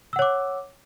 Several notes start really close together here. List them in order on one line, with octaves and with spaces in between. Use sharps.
E6 F#5 C#5 D6